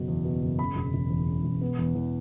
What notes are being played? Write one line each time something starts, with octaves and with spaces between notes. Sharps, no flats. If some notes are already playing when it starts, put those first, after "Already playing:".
Already playing: F#1 B2 F#3
E2
B2
F#1
C#3 B5
E1
E1
E2
C#3
E1
B3
E2
E2